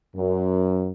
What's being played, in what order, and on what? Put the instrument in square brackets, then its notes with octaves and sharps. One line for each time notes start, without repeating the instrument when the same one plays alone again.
[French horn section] F#2